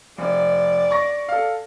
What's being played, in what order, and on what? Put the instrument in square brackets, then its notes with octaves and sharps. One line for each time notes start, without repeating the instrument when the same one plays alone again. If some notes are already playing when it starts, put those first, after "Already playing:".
[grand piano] F1 [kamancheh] D5
[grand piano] C#6 A#6
A4 F5